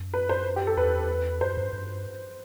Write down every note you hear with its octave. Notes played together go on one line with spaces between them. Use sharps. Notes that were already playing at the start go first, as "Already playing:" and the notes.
Already playing: F#2
B4
C5
G4
A4
E2 B4
F#2 C5
G2
G2